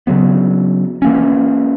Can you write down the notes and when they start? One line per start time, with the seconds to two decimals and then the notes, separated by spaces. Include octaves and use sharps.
0.07 C#3 F#3 B3
1.02 E3 A#3 C#4